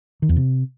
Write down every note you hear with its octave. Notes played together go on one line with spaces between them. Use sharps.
D#3
E2
C3